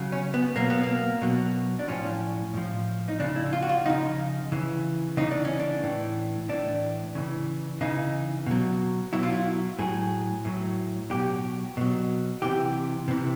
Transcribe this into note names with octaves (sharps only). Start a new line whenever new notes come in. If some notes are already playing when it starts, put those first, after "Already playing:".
Already playing: C#3 F#3
C#4
B3
B2 F#3 A#3
B3
A#3
B2 F#3
D4
A2 F3 C#4
A2 F3
D#4
C#3 F3 D4
E4
F4
F#4
F4
C#3 F3 D#4
C#3 E3
C#3 E3 D#4
D4
C#4
D4
A2 E3
A2 E3 D4
C#3 E3
C#3 E3 D#4
B2 F#3
B2 F#3 E4
F4
E4
A2 F#3 G#4
A2 F#3
B2 F#3 G4
B2 F#3
C3 E3 G4
C3 E3